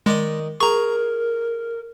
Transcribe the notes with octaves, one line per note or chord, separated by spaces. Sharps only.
D#3 G#3 D5 D#5
G#4 A#4 A#5 C#6